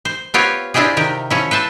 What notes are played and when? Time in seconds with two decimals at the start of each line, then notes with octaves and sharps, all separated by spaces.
0.05 C5
0.34 B3 C4 F4 G4 C#5
0.74 C4 D4 E4 F4 G4 G#4
0.97 C3 D#3 G4
1.30 F3 C#4 E4
1.51 B4 C5 E5 A5